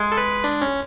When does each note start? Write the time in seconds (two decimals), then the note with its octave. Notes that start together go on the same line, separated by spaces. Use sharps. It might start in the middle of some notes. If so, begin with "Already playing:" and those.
Already playing: G#3
0.12 A4
0.17 B4
0.44 D4
0.61 C#4